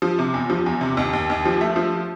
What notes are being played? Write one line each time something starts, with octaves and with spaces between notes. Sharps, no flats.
F3
C3
E2
F3
E2
C3
D#2
D#2
D#2
F3
A3
F3